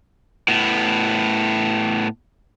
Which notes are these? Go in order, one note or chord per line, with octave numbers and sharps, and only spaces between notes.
A2 B3